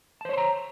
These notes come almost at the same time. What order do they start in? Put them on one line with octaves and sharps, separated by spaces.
A5 C5 C#5 C6 A#5